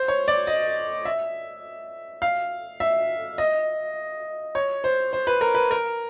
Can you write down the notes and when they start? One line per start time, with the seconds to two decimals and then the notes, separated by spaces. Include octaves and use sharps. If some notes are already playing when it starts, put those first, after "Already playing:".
Already playing: C5
0.08 C#5
0.28 D5
0.47 D#5
1.05 E5
2.22 F5
2.80 E5
3.38 D#5
4.55 C#5
4.84 C5
5.13 C5
5.27 B4
5.41 A#4
5.54 B4
5.71 A#4